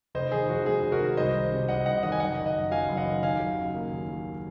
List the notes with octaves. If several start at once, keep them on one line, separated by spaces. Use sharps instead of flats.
F1 C5 D#5
D#3 G#4
F2 F#4
G#3 G#4
F1
F#4 A#4
D#3
C2 C5 D#5
D#3
C3
C2 D#5 F#5
C2 D#5 F#5
D#3 D#5 F#5
G#5
F#1 D#5 F#5
D#3
D#5 F#5
F#2
F#3 F5 G#5
F#1
D#5 F#5
D#3
D#2 F5 G#5
F#3
C#3
A#3
D#2
F#3